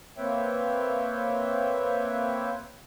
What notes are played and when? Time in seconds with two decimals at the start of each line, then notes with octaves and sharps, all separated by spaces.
0.18 A#3 C4 B4 C#5 E5 G5